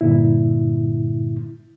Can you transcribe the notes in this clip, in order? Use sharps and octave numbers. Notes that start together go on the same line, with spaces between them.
G2 A#2 D3 E4